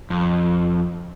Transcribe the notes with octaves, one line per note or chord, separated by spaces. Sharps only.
F2